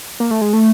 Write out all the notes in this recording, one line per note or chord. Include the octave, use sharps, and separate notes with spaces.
A#3
A3
G#3
A3